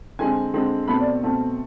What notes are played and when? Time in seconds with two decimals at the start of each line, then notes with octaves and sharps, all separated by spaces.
0.19 D3 G#3 C4 G#5
0.53 D3 G#3 C4
0.88 B2 A3 C4 B5
1.00 D5
1.22 B2 A3 C4